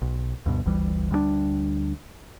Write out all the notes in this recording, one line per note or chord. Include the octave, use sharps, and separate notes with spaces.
B1
D2 G2 B2
G1 D2 E3 G3
D2 G3 G#3 D4